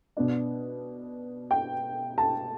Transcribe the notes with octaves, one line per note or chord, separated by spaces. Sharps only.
B2 B3 D4
G5
A5